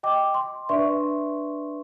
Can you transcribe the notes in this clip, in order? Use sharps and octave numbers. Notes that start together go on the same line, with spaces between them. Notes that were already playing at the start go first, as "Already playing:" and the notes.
D#5 G5 D6
C6
D4 B4 D5 E5 C6 C#6